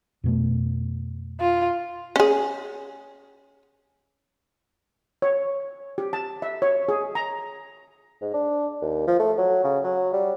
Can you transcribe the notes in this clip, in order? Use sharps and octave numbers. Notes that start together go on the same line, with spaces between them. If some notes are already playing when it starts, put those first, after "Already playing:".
F2 B2 A3
F4
C#4 G#4
C#5
G4
A5
E5
C#5
G#4
A#5
G#2
D4
D#2
F3
A3
F#3
C#3
F#3
G3